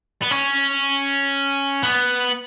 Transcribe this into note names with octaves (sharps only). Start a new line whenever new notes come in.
B3
C#4
B3